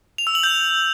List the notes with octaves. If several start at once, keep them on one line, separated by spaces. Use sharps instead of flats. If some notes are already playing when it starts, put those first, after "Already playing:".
F7
E6
F#7
G6